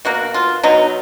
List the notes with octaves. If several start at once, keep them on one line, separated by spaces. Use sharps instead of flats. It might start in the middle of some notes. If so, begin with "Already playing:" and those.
B2 A#3 F#4
F4
B2 F#3 B3 D#4